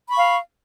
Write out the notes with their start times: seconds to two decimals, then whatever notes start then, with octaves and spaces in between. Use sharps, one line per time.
0.08 B5
0.12 C#6
0.16 F5